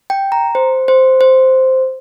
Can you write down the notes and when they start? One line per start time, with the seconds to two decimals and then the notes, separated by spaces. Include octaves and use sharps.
0.10 G5
0.32 A#5
0.55 C5
0.88 C5
1.21 C5